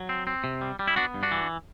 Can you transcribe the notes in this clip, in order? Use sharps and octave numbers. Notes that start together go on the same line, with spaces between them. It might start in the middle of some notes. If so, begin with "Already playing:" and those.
Already playing: F#3
C4
C4
C3
G3
G3
E4
B3 D4 F#4
G2
D4 F#4
E3